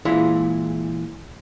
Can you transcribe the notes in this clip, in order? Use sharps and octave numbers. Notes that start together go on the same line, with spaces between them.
A#2 E3 G#3 E4 B5